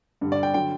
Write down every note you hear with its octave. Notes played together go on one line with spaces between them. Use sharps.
G2 D3 G3
D5
G5
D3 F#3 G5